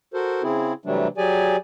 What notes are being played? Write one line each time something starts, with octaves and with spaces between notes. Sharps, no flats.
F#4 A4 A#4 C5
C#3 C4 E4 G#4
C3 E3 F#3 G3 A3 D4
F#3 G4 G#4 D5 G#5